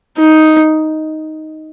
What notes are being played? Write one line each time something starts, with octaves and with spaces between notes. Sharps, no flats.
D#4